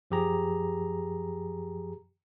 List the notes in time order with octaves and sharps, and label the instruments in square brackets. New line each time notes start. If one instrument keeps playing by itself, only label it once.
[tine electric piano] F#2 F3 G4 G#4 A#5